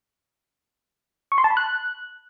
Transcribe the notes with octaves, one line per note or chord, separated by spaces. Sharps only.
C#6
C6
A5
B5
F#6